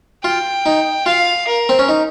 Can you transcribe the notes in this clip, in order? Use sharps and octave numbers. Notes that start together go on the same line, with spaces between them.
F4 G5
D#4
F4 F5
A#4
C4
C#4
D#4